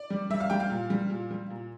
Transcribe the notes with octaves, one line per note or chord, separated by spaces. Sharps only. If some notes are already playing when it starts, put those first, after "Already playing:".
Already playing: D5
G3
G3 E5
F5
G3 G5
F5
A#2
G3
A#2
G3
A#2